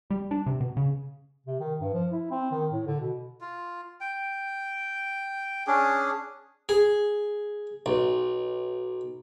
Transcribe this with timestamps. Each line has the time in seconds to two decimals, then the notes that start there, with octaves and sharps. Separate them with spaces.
0.10 G3
0.31 D4
0.46 C3
0.60 B2
0.77 C#3
1.47 C3
1.60 D#3
1.81 G2
1.94 F3
2.11 E4
2.31 C4
2.51 D#3
2.72 A2
2.87 D3
3.00 B2
3.41 F4
4.01 G5
5.67 C#4 D4 G#4
6.69 G#4
7.86 B1